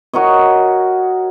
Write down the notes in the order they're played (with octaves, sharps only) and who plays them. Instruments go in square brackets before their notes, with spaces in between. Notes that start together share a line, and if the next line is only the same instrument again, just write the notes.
[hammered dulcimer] F#4 A#4 C#5 D#5